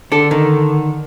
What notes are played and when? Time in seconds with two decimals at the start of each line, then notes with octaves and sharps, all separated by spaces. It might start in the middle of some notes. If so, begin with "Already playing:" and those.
0.12 D3 D4 A4
0.31 D#3